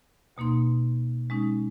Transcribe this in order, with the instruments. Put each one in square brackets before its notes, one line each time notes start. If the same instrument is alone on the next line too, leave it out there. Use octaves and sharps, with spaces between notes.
[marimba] D2 B2 A#3 D#4 C6
G#3 C#4 D#4